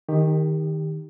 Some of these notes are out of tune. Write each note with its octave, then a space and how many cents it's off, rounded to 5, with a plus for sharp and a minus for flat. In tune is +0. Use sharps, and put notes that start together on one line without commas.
D#3 +0 G4 +20